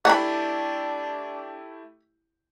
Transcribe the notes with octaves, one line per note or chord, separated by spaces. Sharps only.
A3 D4 E4 G4 F#5 B5